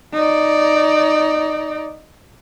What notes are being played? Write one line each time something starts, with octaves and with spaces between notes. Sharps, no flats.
D#4 D5